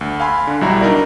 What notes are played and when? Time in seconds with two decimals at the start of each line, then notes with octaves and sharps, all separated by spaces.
0.01 D2
0.20 F5 G#5 B5 C6
0.47 D3
0.61 B1 G3 E4 F#4 A#5
0.81 D4 D#4 A#4 D5